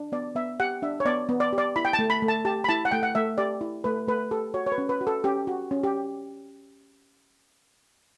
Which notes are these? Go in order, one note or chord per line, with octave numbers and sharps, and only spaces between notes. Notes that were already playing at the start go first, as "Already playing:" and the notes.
Already playing: D4
B3 D5
B3 E5
G4 F#5
D4 E5
C#5
B3 D5
B3
D5
G4
D5
E4 B5
G5
A5
A3
B5
A3
A5
G4 A5
B5
E4 A5
F#5
A3 G5
F#5
A3 E5
G4 D5
E4
A3 B4
A3 B4
G4 A4
F#4 C#5
C#5
B4
C#4
B4
F#4
A4
C#4 G4
F#4
C#4
G4